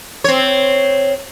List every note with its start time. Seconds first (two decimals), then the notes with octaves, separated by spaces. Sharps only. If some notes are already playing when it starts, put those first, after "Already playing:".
0.24 C4 C#5